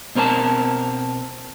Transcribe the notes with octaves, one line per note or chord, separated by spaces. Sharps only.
B2 C4 A#4 B4 A5